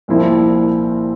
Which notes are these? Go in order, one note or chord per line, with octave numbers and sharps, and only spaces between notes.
C2 A#2 F3 C4 E4